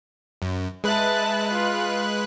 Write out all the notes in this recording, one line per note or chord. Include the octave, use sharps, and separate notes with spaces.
F#2
G#3 B4 E5 A5 F#6
F4